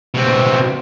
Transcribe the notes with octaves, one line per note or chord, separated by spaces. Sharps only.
B2 C4